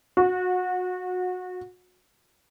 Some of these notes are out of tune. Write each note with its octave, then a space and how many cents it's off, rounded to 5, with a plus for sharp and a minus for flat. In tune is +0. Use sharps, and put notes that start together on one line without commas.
F#4 -25